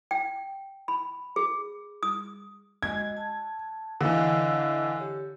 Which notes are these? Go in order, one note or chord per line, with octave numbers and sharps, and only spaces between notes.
G5
B5
G#4
D#6
G#3 F#4 D#5 G#6
A5
D3 E3 C#5 D#5 F5
G4 C#5